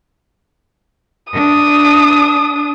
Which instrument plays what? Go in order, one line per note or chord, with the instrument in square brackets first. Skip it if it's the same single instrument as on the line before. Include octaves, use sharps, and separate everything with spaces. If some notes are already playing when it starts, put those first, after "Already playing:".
[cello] D4 [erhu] D#6